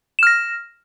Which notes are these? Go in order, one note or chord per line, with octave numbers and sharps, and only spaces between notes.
F6 A#6 E7